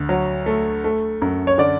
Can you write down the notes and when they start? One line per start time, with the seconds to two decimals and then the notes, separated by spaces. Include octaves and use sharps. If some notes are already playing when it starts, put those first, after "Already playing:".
Already playing: D2
0.09 F#3
0.46 A3
0.84 A3
1.22 F#2
1.47 C#5
1.58 D3 D5